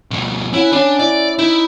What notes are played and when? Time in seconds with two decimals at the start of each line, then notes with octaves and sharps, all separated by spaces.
0.11 B2 F3
0.54 C#4 E4 F#5 B5
0.72 C#4 D4 F#5
0.99 E4 D5
1.39 D#4 E4